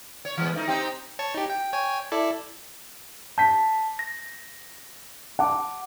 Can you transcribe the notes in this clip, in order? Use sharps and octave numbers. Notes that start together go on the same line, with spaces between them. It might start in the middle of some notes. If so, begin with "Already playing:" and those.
C#5
E3 G#3 B3
A3 D#4
C4 D#4 G4
C#5 A5 C#6
D#4 G4
G5
C#5 G5 G#5
E4 A4 D5
A5 G6 B6
A#6
F#5 A5 D6